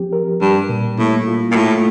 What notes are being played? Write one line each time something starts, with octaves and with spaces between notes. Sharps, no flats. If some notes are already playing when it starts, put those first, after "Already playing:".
Already playing: F3 C4 G4
A#4
G2 G3
A#2
A2 A#3
F4
A#2
A2 A3